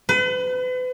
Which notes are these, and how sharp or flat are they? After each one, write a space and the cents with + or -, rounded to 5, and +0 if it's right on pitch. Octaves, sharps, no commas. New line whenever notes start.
B4 +40